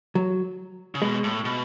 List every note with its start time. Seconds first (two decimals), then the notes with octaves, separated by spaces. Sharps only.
0.15 F#3
0.95 C#3
1.02 B2 G#3
1.24 A2
1.45 B2